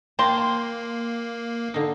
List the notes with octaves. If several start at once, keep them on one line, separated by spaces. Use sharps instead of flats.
A#3 G5 A5 A#5 C6
D3 D#4